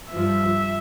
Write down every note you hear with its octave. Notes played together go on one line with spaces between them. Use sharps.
G2 F3 E5